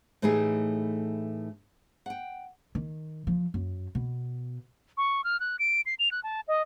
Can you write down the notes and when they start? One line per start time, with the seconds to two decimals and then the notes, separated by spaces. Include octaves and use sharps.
0.22 A2 E3 A3 D#4 G4 G#4
2.06 F#5 G5
2.75 D#3
3.27 F3
3.54 F#2
3.95 B2
4.98 C#6
5.24 F6
5.40 F#6
5.59 D7
5.86 C7
5.99 F7
6.11 F#6
6.24 A5
6.48 D#5